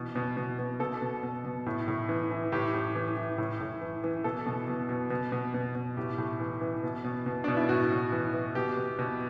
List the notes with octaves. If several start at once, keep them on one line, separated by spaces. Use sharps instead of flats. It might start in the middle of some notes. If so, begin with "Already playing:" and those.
Already playing: B2 E3
B2
B2
B2
B2 A4
B2
B2
B2
A2
A2
E3
E3
A2 G4
A2
E3
E3
A2
A2
E3
E3
B2 A4
B2
B2
B2
B2
B2
B2
B2
A2 G4
A2
E3
E3
B2
B2
B2
B2 D4
E4
A2 F#4
A2
E3
E3
B2 G4
B2
B2